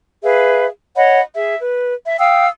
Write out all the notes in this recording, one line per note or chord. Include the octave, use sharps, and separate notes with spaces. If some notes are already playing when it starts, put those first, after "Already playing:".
G#4 B4 E5 F5
C#5 D#5 F#5 B5
G#4 E5
B4
E5
F5 G5 D#6 E6